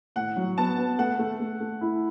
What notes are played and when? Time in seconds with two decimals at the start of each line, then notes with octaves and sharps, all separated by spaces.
0.16 A2 F#5
0.37 F#3
0.58 B3 A5
0.78 B3
0.99 A3 F#5
1.19 A3
1.40 A3
1.60 A3
1.81 E4